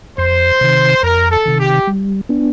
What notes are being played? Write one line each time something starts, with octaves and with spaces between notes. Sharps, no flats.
F2 C5
C3 D#3
F2 A#4
A4
C3 D#3
G4
G3
B3 D4